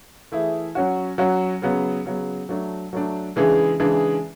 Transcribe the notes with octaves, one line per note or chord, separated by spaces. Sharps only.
E3 A3 E4 G#4
F#3 C#4 F#4
F#3 C#4 F#4
C#3 F#3 B3
C#3 F#3 B3
F#3 A3 D4
F#3 A3 D4
C#3 E3 G#3 D4 G#4
C#3 E3 G#3 D4 G#4